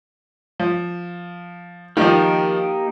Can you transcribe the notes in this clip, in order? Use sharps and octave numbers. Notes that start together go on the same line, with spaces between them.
F3
D#3 F3 A#3 D#4 G4